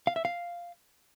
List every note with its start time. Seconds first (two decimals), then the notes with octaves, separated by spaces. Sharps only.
0.07 F5
0.16 E5
0.25 F5